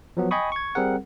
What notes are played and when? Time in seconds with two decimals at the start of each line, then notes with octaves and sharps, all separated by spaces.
0.17 F3 F#3 B3
0.31 D#5 G5 G#5 B5 C#6 D#6
0.52 C#6 G#6
0.75 G3 C4 G#4 A#4 F#5